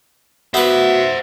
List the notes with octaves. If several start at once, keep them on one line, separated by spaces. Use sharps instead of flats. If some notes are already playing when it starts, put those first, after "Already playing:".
B3 F#4 B4 C5 E5 F#5